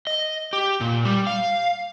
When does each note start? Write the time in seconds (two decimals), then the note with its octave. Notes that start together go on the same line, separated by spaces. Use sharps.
0.07 D#5
0.53 G4
0.81 A#2
1.05 G3
1.27 F5